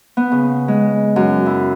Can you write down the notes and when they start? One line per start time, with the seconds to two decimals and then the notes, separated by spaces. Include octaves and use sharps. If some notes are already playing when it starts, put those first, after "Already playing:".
0.17 B3
0.32 C#3
0.68 G#3
1.16 F#2
1.46 E4